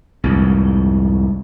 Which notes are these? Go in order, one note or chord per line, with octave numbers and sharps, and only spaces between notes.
C2 F2 G#2